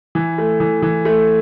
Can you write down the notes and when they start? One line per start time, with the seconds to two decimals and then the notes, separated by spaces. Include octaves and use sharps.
0.15 E3
0.38 A3
0.60 E3
0.82 E3
1.05 A3